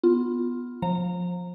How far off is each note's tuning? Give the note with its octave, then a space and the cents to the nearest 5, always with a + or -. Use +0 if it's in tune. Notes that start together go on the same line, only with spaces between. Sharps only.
B3 +0 F4 +5
F3 +25 A#5 -20